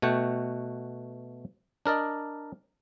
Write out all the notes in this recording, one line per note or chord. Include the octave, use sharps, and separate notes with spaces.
B2 A3 F#4 F#5 G5
D4 A#4 D5 D#5